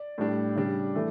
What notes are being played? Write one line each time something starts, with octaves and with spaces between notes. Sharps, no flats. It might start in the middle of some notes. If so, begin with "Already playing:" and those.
Already playing: D5
A2 G3 D4
C#3 G3 D4
E3 A3